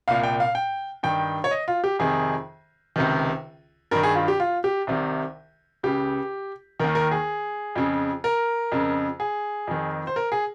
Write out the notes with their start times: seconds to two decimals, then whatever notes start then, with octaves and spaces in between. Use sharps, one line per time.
0.08 C2 A#2 F5
0.24 G5
0.40 F5
0.55 G5
1.03 G2 D#3 G5
1.44 C#5
1.51 D#5
1.68 F4
1.84 G4
1.99 F2 C3 D#3 G#4
2.96 C#2 C3 D#3
3.91 G2 D#3 A#4
4.03 G#4
4.15 F4
4.28 G4
4.40 F4
4.64 G4
4.87 C2 C3 D#3
5.83 C#2 C#3 G4
6.80 D#2 D#3 A#4
6.95 A#4
7.11 G#4
7.76 F2 C#3
8.24 A#4
8.72 F2 C#3
9.20 G#4
9.67 F2 D#3
10.07 C5
10.16 A#4
10.32 G#4